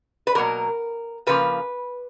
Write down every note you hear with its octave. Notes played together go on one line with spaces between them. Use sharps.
B4
B2 F#3 A#3 A#4
C#3 F3 A#3 B4